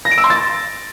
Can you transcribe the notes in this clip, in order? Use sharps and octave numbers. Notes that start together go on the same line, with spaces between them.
A#6
D7
E6
C6
A6